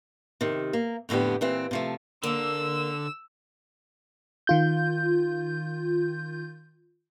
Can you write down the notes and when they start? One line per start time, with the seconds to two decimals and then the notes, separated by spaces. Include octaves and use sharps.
0.41 C3 D#3
0.73 A#3
1.09 F2 A2 D3 B3 G4
1.41 A#2 E3 C4
1.71 C3 F3 A3
2.23 D3 A#3 E6
4.47 D#3 F4 G6